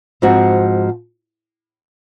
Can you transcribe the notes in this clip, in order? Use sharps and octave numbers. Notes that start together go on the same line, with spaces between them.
G#2 F3 C4 F#4